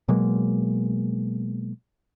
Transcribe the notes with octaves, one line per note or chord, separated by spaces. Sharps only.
B2 F#3 G#3 A#3